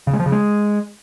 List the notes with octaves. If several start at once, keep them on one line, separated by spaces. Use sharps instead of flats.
C#3
G#3
F3
C#3
G#3